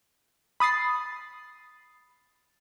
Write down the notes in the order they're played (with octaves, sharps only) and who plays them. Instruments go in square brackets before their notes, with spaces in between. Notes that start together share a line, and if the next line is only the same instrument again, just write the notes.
[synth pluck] B5 D#6 A6 C7